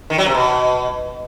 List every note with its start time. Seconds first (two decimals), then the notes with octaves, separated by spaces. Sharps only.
0.10 D#3
0.18 F#3
0.26 C3
0.35 B2